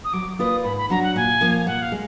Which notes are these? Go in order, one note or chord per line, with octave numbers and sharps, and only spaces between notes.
D#6
F#3 D6
A#3 F4 B4 D5 D#6
G#2 B5
B5
F#3 D4 F#4 A#5
F#5
A#2 G#5
F3 A#3 F4
A#2 F#5
F5
G#3